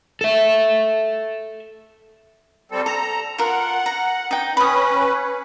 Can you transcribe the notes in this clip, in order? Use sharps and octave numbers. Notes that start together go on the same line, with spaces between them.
A4 E5
G3 C4 A4
A4 A#5
F4 A#4 F#5
A#5
D#4 G5
C#4 B4 B5 D#6